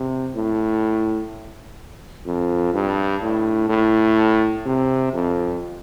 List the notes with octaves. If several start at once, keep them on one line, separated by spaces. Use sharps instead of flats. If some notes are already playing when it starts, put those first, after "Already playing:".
Already playing: C3
A2
F2
G2
A2
A2
C3
F2